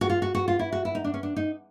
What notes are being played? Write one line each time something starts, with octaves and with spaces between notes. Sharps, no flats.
F#4
F4
F#4
F#4
F4
E4
F#4
E4
D#4
D4
C#4
D4
D#4